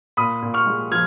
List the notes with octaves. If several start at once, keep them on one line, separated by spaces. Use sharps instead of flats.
A#2 B5 D#6
A#2
C#6 F6
G#3
F3 F6 G#6